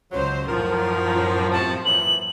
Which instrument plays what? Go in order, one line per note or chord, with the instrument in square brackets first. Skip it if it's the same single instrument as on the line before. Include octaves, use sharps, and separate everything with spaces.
[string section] C#2 C5 [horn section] C#3 F3 F#3
[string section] F#2 A2 F3 [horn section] D#3 F#4 A#4
[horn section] C3 F#4 [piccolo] A5
[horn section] A#2 E3 F#3 [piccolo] F#7